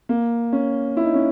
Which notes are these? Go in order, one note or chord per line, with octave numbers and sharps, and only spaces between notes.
A#3
C#4
E4
D#4
C#4